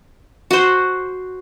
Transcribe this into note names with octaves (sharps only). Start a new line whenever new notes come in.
F#4 C5